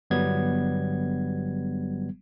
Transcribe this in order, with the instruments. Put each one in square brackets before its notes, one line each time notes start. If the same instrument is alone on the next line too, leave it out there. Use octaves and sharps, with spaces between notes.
[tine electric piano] G1 F#3 G3 B3 G#6